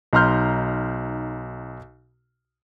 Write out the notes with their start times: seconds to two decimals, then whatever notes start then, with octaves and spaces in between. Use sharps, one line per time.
0.13 B1 D#4 A#5 C6 F6 G6